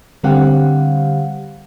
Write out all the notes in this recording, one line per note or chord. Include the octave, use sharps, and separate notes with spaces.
D3 G3 C4 G4 F5 F#5